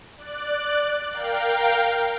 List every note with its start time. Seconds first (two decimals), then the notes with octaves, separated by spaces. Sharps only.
0.17 D5 F#6
1.11 A#4 F5 G5